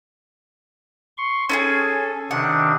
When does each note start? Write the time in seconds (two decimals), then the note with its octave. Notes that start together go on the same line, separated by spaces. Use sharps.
1.18 C6 C#6
1.49 C#4 F4 G#4 A4
2.31 C3 D#3 D4 F#5